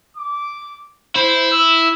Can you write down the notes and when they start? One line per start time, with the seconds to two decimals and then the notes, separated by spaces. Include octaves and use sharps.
0.17 D6
1.16 E4 C5
1.52 E6